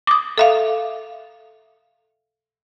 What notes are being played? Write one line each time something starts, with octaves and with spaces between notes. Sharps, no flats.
D6 D#6
A4 E5 F5